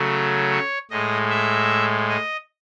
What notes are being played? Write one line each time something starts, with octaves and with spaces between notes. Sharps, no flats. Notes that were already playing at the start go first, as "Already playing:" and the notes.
Already playing: C#3 F#3 A3
C#5
A2 G#3 D#5
E5
D#5